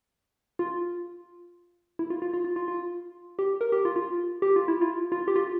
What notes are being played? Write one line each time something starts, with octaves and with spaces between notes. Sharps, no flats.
F4
E4
F4
F4
F4
F4
F4
F4
G4
A#4
G4
F4
F4
G4
F4
E4
F4
F4
G4
F4